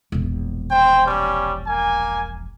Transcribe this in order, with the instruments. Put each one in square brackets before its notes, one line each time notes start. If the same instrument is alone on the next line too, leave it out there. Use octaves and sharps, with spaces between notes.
[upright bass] E1 A#1
[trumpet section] C5 G5
G3 C#4
A#3 G#5